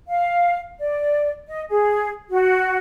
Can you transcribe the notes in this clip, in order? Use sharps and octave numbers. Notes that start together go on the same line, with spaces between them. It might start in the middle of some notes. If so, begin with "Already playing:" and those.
F5
D5
D#5
G#4
F#4